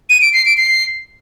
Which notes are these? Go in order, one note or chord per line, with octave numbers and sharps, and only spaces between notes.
D#7
D7
C7
D7
C7